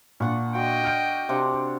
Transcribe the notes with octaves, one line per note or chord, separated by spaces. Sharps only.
A#2 D4 F#5 C#6
F#4 D#5 G5
F6 G6 D7
C3 D4 F#5